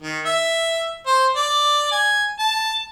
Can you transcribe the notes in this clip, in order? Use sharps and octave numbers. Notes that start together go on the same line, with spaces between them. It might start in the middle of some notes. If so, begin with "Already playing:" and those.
D#3
E5
C5
D5
G#5
A5